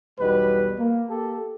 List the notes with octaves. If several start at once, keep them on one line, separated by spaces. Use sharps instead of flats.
B1 E2 B2 G3 B4
A#3
A#3 G4 A4